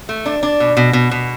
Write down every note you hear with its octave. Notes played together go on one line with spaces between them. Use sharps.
A3
D4
D4
B2
B2
B2
B2